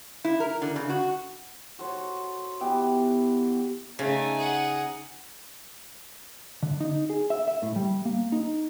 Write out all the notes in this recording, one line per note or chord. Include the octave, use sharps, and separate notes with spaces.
E4
A#4
D3
C#3
F#4
F#4 A4 C5 C#5
E3 B3 G4 G5
C#3 A3 D#4 G#5
G#4 F#5
D3
D#4
G#4
E5
E5
A2
G3
A#3
D#4